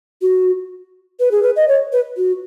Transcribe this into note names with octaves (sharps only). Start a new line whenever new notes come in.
F#4
B4
G#4
B4
D#5
C#5
B4
F#4